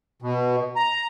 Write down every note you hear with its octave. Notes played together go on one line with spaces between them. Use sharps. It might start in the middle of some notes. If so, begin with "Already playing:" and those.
B2
A#5